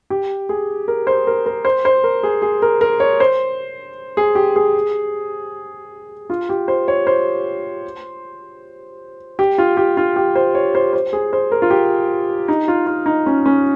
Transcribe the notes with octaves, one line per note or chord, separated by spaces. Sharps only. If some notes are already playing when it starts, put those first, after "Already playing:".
G4
G#4
A#4
C5
A#4
A#4
C5
C5
A#4
G#4
G#4
A#4
A#4
C#5
C5
G#4
G4
G#4
F4
G4
C5
C#5
C5
G4
F4
G4
F4
G4
C5
C#5
C5
C5
G#4
C5
A#4
F4
G4
D#4
F4
F4
D#4
C#4
C#4